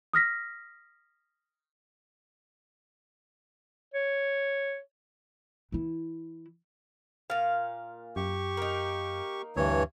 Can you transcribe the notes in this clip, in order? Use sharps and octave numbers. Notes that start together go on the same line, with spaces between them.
D#6 F6 A#6 B6
C#5
E3 E4
A#2 F5
F#2 G4 C#6
A#3 D#4
D2 G2 E3 C#5